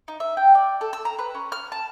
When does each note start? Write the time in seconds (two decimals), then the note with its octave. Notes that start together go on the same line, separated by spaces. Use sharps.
0.08 D#4
0.20 E5
0.37 G5
0.55 D5
0.81 A4
0.93 E6
1.05 A#5
1.19 B4
1.35 C#4
1.52 F6
1.72 A5